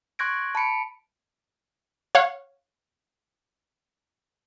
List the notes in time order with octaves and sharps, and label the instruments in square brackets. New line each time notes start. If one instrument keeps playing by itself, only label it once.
[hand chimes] C6 C#6 F#6 G#6 A#6 D7
A5 B5 C#7 D7
[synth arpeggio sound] C#5 F5 F#5